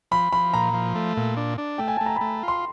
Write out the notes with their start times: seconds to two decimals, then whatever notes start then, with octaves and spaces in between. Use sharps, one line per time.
0.11 F3 B5
0.32 F3 B5
0.53 A#2 A#5
0.74 F3
0.95 A3
1.17 A#2
1.37 D4
1.58 D4
1.78 A3 G5
1.88 G#5
1.97 A3 A5
2.06 A#5
2.16 A3 B5
2.43 F4 C6